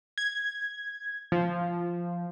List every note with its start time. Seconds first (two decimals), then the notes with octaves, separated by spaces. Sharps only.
0.18 G#6
1.32 F3